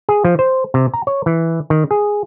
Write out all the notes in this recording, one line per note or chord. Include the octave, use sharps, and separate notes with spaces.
G#4
F3
C5
C3
A#5
C#5
E3
D#3
G#4